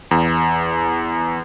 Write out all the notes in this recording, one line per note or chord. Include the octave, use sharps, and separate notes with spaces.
E2